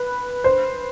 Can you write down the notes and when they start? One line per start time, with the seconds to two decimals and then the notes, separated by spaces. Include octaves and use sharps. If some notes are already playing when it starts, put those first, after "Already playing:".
Already playing: B4
0.44 C5